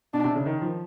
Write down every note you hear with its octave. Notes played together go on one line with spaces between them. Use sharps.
B2 D4
C3
C#3
D#3
F3